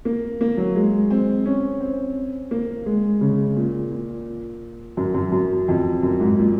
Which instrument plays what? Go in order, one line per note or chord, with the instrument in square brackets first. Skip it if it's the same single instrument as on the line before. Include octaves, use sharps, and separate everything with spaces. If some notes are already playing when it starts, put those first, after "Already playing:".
[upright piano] A#3
A#3
F#3
G#3
C4
C#4
C4
A#3
G#3
C#3
A#2
A#2
F#2
F#2
F#2
F2
F#2
G#2
A#2